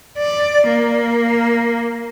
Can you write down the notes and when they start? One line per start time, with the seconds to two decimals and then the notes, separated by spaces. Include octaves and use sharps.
0.18 D5
0.67 A#3